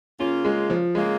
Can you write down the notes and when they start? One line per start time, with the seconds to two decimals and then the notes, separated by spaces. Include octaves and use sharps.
0.20 C#3 A#3 C#4 F4
0.45 G#3
0.70 F3
0.95 C#3 G#3 A#3 F4